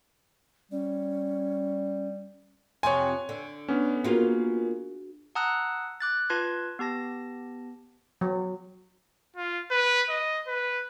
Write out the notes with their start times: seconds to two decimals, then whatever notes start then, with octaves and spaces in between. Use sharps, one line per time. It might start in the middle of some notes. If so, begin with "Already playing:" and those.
0.72 G3 C#4
2.83 F2 C3 F#3 C#5 G#5 C6
3.29 D3
3.68 B3 C#4 D4
4.04 A#3 F4 F#4 G#4
5.35 F#5 A5 A#5 D#6 E6 F#6
6.01 D6 F#6 A6
6.30 F4 B4 A5 C6 G#6
6.79 B3 G4 A5 A#6
8.21 F#3
9.37 F4
9.71 B4
10.10 D#5
10.48 B4